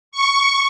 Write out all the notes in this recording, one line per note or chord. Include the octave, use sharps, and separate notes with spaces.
C#6